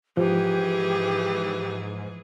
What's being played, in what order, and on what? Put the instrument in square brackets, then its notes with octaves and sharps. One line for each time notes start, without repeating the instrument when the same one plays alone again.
[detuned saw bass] G#2 [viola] E3 G#4 [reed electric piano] F3 [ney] G4